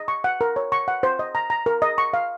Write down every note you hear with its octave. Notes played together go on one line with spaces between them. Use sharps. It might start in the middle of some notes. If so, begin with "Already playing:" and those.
Already playing: D#5
C#6
F#5
A#4
C#5
C#6
F#5
C5
D#5
A#5
A#5
A#4
D#5
C#6
F5